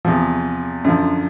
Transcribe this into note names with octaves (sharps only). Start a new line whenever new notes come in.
E2 C3 F3
F#2 D3 F3